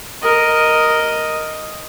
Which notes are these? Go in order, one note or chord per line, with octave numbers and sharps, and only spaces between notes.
A#4 D#5